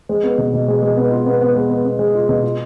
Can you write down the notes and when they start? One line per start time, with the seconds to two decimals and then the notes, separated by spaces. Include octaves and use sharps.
0.09 G#3
0.23 B3
0.38 B2
0.53 B2
0.68 G#3
0.82 G#3
0.97 B3
1.11 F4
1.26 B3
1.41 B3
1.55 G#3
1.70 B3
1.85 B3
1.99 G#3
2.15 F4
2.29 B2
2.43 F4